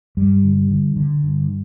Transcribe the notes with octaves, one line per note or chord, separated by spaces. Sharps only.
G2 G3
D3
G3
D3
D3
G2